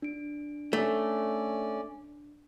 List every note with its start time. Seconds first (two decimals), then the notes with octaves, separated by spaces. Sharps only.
0.02 D4 D7
0.73 A3 C#4 D5